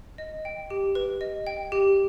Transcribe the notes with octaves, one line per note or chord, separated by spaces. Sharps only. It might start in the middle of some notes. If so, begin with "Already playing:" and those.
D#5
G5
G4
B4
D#5
G5
G4